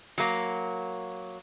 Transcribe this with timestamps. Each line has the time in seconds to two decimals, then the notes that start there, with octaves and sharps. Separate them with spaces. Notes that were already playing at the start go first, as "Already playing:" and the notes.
0.18 F#3 A#3